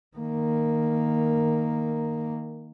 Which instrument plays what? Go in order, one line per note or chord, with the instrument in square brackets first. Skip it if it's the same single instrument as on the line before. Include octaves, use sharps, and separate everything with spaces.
[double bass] D#3 A#3